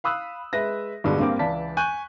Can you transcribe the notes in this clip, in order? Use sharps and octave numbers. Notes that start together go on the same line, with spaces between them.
F5 B5 D#6 E6 F#6
G#3 B4 E5 A#6
G2 B2 D3 G#3
G2 A#3 C4 D6
C#2 E3 D5 A5 B6
G#5 C#6 F#6 G6